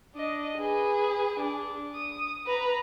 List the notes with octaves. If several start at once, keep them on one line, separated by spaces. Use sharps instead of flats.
D4 D#5
G#4 B4
D4
D#6
B4 A#5